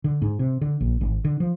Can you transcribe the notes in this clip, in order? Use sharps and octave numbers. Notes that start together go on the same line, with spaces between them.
D3
G#2
C3
D3
A#1
G#1
D3
F3